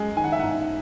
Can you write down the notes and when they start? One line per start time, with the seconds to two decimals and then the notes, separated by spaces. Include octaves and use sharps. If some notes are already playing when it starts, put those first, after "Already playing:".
Already playing: F#2 G#3 G#5
0.16 D#3 G#5
0.24 F#5
0.32 E5
0.40 G#2 F#5